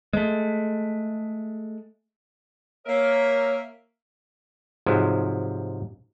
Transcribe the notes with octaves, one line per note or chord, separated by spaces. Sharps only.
G#3 A3
A#3 A#4 C#5 E5
G#2 C3 F3 F#3 G#3